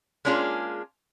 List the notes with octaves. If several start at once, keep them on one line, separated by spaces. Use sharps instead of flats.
G#3 A#3 C#4 D4 F4 G#4